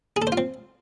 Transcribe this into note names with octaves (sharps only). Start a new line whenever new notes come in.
G#4
A4
C5
F4
C4